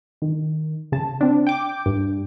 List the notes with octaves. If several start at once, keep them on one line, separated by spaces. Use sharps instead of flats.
D#3
C#3 A5
C4 D4
G5 D6
G2